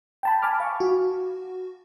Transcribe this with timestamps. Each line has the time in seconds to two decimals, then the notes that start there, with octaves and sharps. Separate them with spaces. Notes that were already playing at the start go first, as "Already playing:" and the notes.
0.23 G5 A5 B5
0.42 G#5 A5 B5 D6 F6
0.60 F5 C#6
0.80 F#4